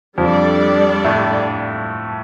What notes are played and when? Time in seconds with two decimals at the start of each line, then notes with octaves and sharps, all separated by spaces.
0.18 F2 F3 G3 D4 A4 D5
1.04 A2 A3